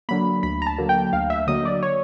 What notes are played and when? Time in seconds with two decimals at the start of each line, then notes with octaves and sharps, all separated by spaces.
0.09 D3 F#3 A#3 B5
0.43 D2 B5
0.62 A#5
0.67 A5
0.78 D3 F#3 A#3
0.89 G5
1.13 D2 F5
1.30 E5
1.47 D3 F#3 A#3 D#5
1.65 D5
1.83 C#5